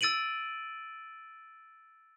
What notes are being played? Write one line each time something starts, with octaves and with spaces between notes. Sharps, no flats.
E6 A6 D7 D#7 F#7